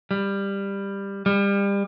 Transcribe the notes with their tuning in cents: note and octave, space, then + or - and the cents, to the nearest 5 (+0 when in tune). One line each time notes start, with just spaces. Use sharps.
G3 +15
G3 +30